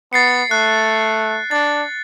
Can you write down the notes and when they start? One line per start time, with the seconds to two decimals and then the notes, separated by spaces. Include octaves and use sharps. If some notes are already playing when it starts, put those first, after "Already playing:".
0.13 B3 A6 C7 C#7
0.51 A3 F#6
1.51 D4 A6